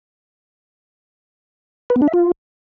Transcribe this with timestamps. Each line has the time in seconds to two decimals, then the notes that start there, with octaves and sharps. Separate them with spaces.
1.90 B4
1.96 B3
2.02 D4
2.08 E5
2.14 F4